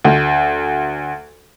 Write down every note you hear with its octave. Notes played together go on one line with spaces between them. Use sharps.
D2